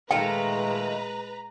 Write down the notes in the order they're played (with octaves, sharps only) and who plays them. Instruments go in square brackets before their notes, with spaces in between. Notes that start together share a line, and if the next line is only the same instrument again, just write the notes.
[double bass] A#2 G#3 [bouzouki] D#3 A3 F4 [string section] B4 A#5 [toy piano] G5